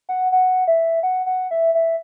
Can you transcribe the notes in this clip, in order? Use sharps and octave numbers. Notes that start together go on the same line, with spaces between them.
F#5
F#5
E5
F#5
F#5
E5
E5